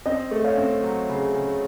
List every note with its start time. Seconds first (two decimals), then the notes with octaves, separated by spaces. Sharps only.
0.06 C4 D#5
0.31 A3
0.44 C#5 F5
0.57 C4
0.83 F#3
1.09 C#3
1.34 C#3